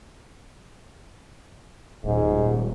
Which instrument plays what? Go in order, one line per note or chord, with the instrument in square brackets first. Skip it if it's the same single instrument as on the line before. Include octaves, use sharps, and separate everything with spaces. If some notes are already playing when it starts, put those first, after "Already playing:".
[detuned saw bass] D#1 [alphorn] G#2